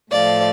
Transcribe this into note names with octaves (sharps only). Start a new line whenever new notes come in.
A2 F3 A3 D5 F5